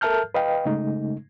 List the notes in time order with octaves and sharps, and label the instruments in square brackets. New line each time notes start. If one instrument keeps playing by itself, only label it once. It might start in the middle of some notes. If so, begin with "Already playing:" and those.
[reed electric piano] A4 A#4 E5 A5 F6 G6
B4 D#5 F5 G5
C#3 G#3 A3 D#4